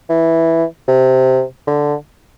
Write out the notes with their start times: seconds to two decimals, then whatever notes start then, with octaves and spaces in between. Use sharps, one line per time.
0.10 E3
0.88 C3
1.67 D3